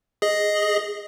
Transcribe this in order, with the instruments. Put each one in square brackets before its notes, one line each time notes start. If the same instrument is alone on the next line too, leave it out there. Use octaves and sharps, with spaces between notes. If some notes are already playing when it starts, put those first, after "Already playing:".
[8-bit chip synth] G#4 D#5